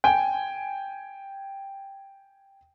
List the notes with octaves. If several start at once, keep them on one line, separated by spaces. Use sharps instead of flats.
G5 G#5